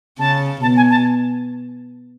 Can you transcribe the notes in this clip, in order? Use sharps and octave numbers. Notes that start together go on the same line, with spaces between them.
C#3 A5
B2 A5
G#5
A5